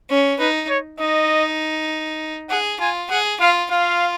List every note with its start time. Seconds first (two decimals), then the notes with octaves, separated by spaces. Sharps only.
0.10 C#4
0.39 D#4 B4
0.69 C#5
1.00 D#4 D#5
2.49 G#4 F#5
2.80 F4 G#5
3.10 G#4 F#5
3.40 F4 F5
3.70 F4 F5